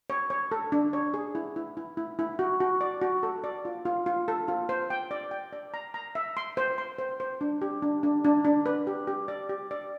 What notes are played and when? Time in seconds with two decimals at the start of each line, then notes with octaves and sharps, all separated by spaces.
0.10 C#5
0.30 C#5
0.52 A4
0.72 D4
0.93 C#5
1.14 G#4
1.35 E4
1.56 E4
1.77 E4
1.97 E4
2.19 E4
2.39 F#4
2.60 F#4
2.81 D5
3.02 F#4
3.23 A4
3.44 D5
3.65 F4
3.85 F4
4.06 F4
4.28 A4
4.48 F4
4.69 C5
4.90 G5
5.11 D5
5.31 G5
5.53 D5
5.74 A#5
5.94 A#5
6.15 E5
6.37 C6
6.57 C5
6.78 C6
6.98 C5
7.20 C5
7.41 D4
7.62 G4
7.82 D4
8.03 D4
8.24 D4
8.45 D4
8.66 B4
8.87 G4
9.07 G4
9.28 D5
9.49 G4
9.71 D5